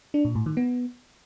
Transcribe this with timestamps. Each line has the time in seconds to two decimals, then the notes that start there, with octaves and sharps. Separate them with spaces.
0.14 D4
0.25 A#2
0.35 A2
0.46 D#3
0.57 B3